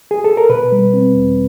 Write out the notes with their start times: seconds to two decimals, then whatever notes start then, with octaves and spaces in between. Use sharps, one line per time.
0.11 G#4
0.24 A4
0.37 A#4
0.49 B2 B4
0.72 G3
0.94 C4
1.15 E2